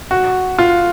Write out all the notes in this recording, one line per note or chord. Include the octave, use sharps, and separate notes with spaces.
F#4
F4